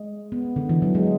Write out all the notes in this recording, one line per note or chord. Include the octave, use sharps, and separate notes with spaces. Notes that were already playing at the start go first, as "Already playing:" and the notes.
Already playing: G#3
B3
D3
E3
F#3
G#3